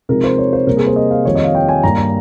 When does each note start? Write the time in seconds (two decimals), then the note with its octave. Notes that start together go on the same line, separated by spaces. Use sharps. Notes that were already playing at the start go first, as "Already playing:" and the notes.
0.09 C3 F3 G#3 C4 D#4 A#4
0.24 C5
0.38 C#5
0.53 C5
0.67 C3 G3 A#3 A#4
0.77 G#4
0.86 C5
0.96 D#5
1.11 F5
1.25 F2 D#3 G3 C#5
1.35 D#5
1.44 F5
1.55 G5
1.69 G#5
1.83 G2 G3 A#3 A#5
1.98 A#5